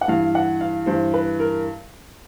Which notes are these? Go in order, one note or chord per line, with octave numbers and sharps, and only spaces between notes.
F#5
G2 E3 F5
F#5
F5
G2 E3 C5
B4
A#4